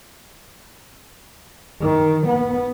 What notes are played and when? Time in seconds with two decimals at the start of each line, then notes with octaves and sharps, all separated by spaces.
1.81 D#3
2.27 B3